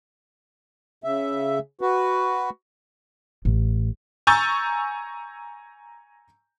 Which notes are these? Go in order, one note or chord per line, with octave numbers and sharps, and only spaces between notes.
C#3 E5
F#4 B4
A1
G#5 A#5 C#6 E6 G6 A6